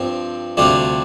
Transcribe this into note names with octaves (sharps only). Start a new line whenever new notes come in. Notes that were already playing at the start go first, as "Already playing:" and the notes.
Already playing: G2 F3 C4
D2 C3 G3 D4 F4